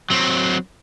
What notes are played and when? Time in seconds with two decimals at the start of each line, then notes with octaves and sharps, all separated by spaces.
0.10 F#3 C4